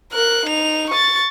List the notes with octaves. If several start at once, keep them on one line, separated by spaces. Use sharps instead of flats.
A#4 F#6
D#4 F7
C#6 A6